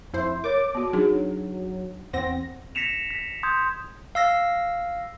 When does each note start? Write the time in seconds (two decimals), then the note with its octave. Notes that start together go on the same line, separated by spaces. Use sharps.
0.13 F2 E4 C5
0.44 A#4 C#5 D6
0.75 B3 F#4
0.93 F#3 D4 D#4 G#4
2.13 E2 C4 F#5 A#6
2.75 A#6 B6 C#7 E7 F7
3.11 B6
3.43 C6 D#6 G6 G#6
4.15 F5 E6 A#6